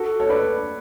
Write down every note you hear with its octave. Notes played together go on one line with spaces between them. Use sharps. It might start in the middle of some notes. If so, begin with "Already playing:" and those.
Already playing: F#4 A4
A4 C#5
B4 D5